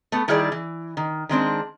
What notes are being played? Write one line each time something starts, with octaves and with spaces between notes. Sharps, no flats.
A3 B3
D#3 G3 E4 G#4 A#4 D5
E3
D#3
D#3 G#3 C4 D4